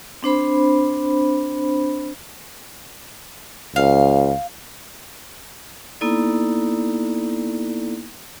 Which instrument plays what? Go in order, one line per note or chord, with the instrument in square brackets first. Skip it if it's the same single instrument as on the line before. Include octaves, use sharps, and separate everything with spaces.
[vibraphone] C4 D4 C5 B5
[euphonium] C#2 [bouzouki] F5
[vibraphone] A#3 B3 D#4 E4 A4 D5